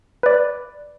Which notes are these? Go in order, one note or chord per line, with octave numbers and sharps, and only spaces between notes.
B4 D5